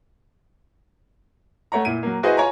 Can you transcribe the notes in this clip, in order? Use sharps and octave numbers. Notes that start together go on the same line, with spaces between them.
A3 C#5 F#5 A#5
A#2 E4 D#7
F#3 A#3
E4 F#4 G#4 B4 C5 D#5
F4 C#5 G#5 A#5